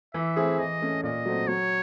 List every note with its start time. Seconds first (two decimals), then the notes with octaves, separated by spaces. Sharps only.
0.14 E3 E5
0.36 A3 C4 E4 G#4
0.59 E3 D#5
0.81 A3 C#4
1.03 A#2 D#5
1.26 F#3 A3 C4
1.47 F#3 C#5